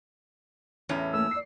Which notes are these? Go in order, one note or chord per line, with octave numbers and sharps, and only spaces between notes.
E2 A2 C#4
A3 A#3 E6
D5 C7